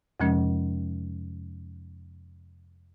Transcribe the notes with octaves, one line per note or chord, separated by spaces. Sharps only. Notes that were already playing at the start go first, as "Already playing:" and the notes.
F2 C3 F3 G#3 C#4